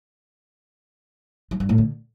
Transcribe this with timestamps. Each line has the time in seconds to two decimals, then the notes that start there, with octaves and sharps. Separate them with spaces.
1.51 F#3
1.60 G2
1.69 A2
1.78 D3